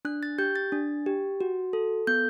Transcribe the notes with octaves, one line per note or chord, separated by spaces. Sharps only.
D4 F#6
A6
G4 G6
A6
D4
G4
F#4
A4
B3 G6